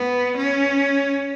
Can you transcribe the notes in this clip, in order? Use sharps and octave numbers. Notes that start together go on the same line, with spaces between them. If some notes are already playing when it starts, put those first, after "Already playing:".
Already playing: B3
C#4